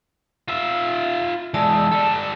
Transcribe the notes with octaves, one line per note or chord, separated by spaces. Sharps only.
F4 E5
E3 G#3 D5 A5 E6
G3 A4